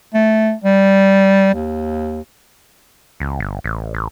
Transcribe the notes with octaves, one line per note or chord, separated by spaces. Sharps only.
A3
G3
D#2
C#2
G1
A1
A1